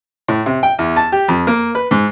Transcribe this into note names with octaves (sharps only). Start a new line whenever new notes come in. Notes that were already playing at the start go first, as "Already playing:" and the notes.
A2
C3
G5
E2
A5
G4
F2
A#3
B4
G#2